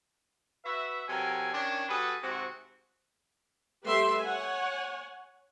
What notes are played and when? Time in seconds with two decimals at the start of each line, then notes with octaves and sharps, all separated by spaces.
0.65 F#4 B4 E5
1.08 C3 F#3 A4 A#4 G#5
1.53 D#3 C#4 D4
1.89 G3 F#4 G#4 A4 B4
2.22 G#2 C3 C4 F#4
3.84 G3 A3 G4 B4 E5 C6
4.22 C#5 F#5 G#5